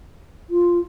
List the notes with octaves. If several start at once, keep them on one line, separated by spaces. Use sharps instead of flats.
F4